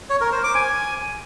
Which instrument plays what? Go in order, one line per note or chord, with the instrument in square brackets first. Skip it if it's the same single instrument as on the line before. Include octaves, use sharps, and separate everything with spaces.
[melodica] C#5
A#4
C5
D6
G#5